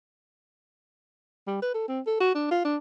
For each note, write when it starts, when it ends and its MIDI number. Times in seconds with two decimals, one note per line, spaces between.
1.47 1.61 55
1.62 1.73 71
1.74 1.85 69
1.88 2.00 60
2.07 2.17 69
2.20 2.33 66
2.35 2.50 62
2.51 2.63 65
2.65 2.77 62